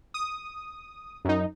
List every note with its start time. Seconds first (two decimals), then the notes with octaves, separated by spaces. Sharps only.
0.14 D#6
1.25 F#2 D#4